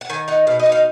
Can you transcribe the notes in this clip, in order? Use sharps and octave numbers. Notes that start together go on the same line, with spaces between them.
F#5
D#3 G#5
D#4 F#5
B2 F5
D#5
D#4
F5